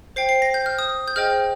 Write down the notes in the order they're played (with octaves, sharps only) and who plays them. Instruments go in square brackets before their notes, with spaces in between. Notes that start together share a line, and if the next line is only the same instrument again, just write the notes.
[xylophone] C5 G5 C7
C7
A#6
G6
F6
D#6
G6
G#4 C5 D#5 G5 F6